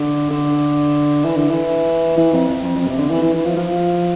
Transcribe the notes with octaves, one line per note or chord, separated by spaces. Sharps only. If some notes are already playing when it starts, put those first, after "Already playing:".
Already playing: D3
D3
E3
D3
E3
E3
F2
F2
F2
F2
C3
D3
E3
E3
E3
F3
F3